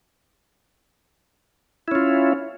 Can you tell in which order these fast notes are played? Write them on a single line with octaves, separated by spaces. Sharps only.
E4 C#4 F4